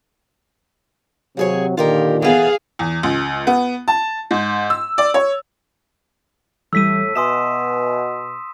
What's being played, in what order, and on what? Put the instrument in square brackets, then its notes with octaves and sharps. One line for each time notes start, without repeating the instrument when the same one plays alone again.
[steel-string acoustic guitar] D#2 G#4 C#5 [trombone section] C3 F#3
[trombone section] A#2 D3 D#3 [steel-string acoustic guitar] F4 G4 A#4
[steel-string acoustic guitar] E3 B3 A4 [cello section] G#4 F5
[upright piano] E2
C#2
B3
A5
G#2
E6
D5
C#5
[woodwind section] A2 [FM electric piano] E3 G3 [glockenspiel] E6 B6 D#7
[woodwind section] B2 [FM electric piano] E5 F#5 G#5 [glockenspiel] C6 D#6 E7